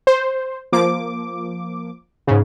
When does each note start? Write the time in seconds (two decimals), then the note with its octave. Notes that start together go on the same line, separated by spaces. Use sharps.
0.07 C5
0.73 F3 A#3 D6
2.27 G#2 C#3